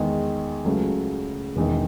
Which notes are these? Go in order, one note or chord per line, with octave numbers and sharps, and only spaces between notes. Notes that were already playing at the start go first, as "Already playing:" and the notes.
Already playing: E2 D#3 G#3
C#2 C#3 F#3 A3 C#4
E1 E2 D#3